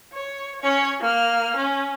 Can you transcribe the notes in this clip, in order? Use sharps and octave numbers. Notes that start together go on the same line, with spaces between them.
C#5
C#4 C#5
A#3 F6
C#4